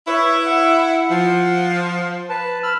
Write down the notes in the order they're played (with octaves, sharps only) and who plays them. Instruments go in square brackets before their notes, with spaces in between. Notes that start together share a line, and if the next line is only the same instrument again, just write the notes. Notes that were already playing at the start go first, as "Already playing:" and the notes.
[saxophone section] E4 [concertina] B4 C#5 C#6
[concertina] F#5
[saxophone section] F3
[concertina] B4 A5
B5 E6 F6